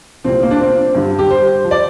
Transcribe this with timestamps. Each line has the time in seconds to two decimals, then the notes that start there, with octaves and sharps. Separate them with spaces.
0.24 C2 A#2 F3 C4
0.43 A#3
0.51 D4
0.60 C4
0.95 G2 D3 G3
1.19 G4
1.30 C5
1.64 F3
1.71 D5